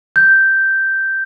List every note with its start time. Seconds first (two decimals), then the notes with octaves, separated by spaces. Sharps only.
0.16 G6